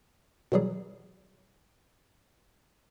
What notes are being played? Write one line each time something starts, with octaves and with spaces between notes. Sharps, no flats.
B2 D#3 E3 F#3 G3 G#4